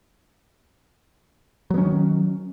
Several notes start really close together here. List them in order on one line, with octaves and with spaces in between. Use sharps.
F#3 B3 C#4 D#3